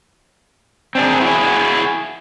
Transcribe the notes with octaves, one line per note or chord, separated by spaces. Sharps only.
C4 D4 G#4
E4 F#4 G#4